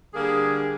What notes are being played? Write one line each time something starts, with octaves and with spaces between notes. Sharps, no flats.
D3 G3 A#3 G#4